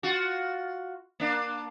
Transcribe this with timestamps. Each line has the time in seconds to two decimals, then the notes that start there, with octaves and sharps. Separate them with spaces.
0.03 F4 F#4
1.20 A#3 D4